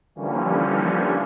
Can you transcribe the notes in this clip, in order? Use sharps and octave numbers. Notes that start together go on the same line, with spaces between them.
D3 E3 F3 G3 A#3 C#4